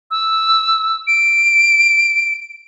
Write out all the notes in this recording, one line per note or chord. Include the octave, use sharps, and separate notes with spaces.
E6
D7